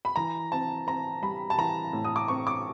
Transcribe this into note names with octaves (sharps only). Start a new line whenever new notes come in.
B5
E3 A#5
C4 A5
C4 A#5
G3 B5
A5
E3 A#5
A2
D#6
D6
C4 C#6
D6